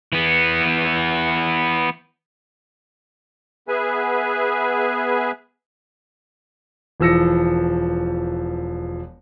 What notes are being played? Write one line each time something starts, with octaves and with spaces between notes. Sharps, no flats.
E3 B3
B3 G#4 B4 E5 G#5
E1 E3 F3 E6 A#6 C#7